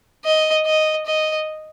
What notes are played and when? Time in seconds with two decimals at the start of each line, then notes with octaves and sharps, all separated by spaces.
0.25 D#5
0.66 D#5
1.06 D#5